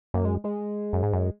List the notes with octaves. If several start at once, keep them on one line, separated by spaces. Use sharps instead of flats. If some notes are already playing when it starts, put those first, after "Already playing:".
F#2 A#3
G#3
G#3
F#2
G#2
F#2